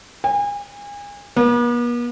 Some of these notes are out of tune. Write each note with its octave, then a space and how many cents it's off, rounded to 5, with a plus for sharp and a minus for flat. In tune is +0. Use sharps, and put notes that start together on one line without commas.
G#5 -35
B3 -45